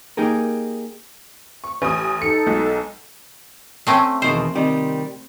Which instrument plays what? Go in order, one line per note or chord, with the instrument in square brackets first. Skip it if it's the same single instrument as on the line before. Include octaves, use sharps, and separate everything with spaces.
[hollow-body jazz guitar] A#3 D#4 G4 G#4 A#4
[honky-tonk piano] C#6
A1 G#5 D#6
[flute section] D#4 A4 [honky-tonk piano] C#7
[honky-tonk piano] B1 G#3
[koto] A3 C4 C#4
[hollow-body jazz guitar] E2 B2 D#3 [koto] C5
[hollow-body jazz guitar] C3 D#3 G3